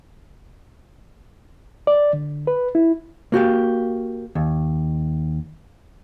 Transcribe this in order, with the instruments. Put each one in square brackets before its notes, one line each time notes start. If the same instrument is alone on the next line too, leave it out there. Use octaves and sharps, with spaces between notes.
[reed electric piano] D5
D3
B4
E4
[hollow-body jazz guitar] A#3 F#4 G4 F5
D#2